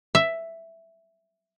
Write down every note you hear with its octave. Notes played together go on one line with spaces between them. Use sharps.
E5